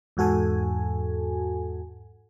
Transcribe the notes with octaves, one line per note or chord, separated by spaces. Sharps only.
E2 G#2 F#4 A4 G#5